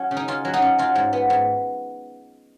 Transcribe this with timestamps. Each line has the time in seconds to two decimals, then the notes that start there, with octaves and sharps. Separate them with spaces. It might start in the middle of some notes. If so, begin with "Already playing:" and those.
Already playing: F#3 C#4
0.11 C#3
0.17 D#4
0.28 C#4 F4
0.45 F#3
0.54 D#4
0.62 C#4
0.79 F#3 F4
0.95 G#2
1.13 B3
1.30 G#2